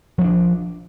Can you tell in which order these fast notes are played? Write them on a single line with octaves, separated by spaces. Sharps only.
F3 C#4 D4